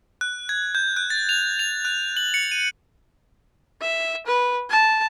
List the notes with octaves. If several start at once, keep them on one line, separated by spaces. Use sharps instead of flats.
F#6
G#6
G6
F#6
A6
F7
F7
F#6
F#7
C#7
D#7
E5
B4
A5